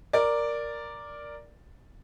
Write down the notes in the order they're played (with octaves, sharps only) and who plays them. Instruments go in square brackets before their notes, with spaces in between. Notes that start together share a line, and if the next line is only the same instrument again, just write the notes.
[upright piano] A#4 D5